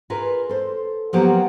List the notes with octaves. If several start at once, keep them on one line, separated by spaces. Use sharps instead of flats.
F4 G#4 A#4 B4
A4 C5
F3 F#3 A#3 B3 F#4 G4